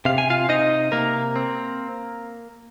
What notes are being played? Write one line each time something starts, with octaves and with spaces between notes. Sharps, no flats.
C3 F5
G#5
F4 F5
C3 D#4 D#5
C3 A#3 A#4
C4